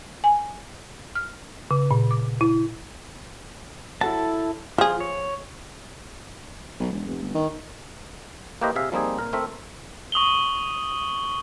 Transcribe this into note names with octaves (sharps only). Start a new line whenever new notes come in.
G#5
F6
C#3
A#2
D6
E4
F#3 E4 A4 A5
F3 F4 G#4
C#5
B1
E1
F1
G1
D#3
A#3 E4 G4 B4 C5 D#5
C3 G#4 E5 F5
F3 G3 A#3 C4 D#4 G#4
A#2 A#4
A3 C4 A#4 E5
C#6 D#6 F#7 G7